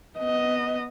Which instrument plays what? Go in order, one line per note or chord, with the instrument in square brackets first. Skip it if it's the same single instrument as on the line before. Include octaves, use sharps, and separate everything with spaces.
[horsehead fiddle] B3 D#5